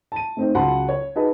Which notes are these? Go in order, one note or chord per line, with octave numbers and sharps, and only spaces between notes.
A5 D#7
A3 C4 D#4
C#2 F#3 F#5 A5 B5 C6
C#5
D#4 F#4 G#4 B4 D#5 A5